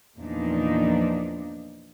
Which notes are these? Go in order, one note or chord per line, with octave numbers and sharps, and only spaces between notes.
E2 A#2 F3 D4 D#4